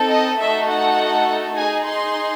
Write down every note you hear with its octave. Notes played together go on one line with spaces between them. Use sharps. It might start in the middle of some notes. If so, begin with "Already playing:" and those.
Already playing: C4 D#4 A4
D#5
A3 D#4 F#4 A4 E5
F#5
D#4 G#4 G#5
C6